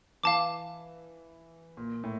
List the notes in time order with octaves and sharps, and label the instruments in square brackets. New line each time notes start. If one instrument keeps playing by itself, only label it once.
[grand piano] E3 [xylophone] F5 A5 D6
[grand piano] A#2
A2